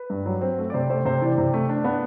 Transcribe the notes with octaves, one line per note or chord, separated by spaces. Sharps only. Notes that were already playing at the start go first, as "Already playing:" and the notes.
Already playing: B4
G2
F#3
C4
A3
D5
C3 C5
A3 C5
C3 C5
E3 D5
C3
A3
D4
B3